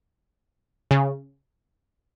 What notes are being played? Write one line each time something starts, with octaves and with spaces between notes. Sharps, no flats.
C#3